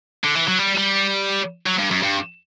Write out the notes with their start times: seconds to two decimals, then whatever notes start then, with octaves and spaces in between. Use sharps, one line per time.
0.24 D3
0.35 E3
0.48 F#3
0.59 G3
0.77 G3
1.66 F#3
1.78 G2
1.91 F#2
2.03 G2